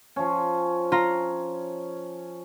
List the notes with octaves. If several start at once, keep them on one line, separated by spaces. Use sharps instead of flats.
F3 C#4
F4 A#5